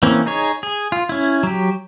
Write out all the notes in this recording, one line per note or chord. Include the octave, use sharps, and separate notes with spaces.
E3 A#3 C4 C#4
D#4 G#4 C#5
G#4
F4
C#4 E4
F#3 G4